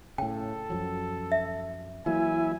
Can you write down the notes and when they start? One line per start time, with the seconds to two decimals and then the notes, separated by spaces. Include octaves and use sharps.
0.18 A2 C#3 A4 G5
0.70 F#2 F3 F#3
1.32 E5
2.06 E3 F#3 A#3 E4 G#5